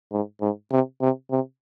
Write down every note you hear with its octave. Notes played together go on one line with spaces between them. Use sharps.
G#2
G#2
C3
C3
C3